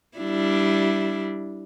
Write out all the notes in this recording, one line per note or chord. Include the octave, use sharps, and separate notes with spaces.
G3 D4 E4